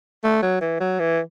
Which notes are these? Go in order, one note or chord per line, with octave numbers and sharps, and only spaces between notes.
A3
F#3
E3
F#3
E3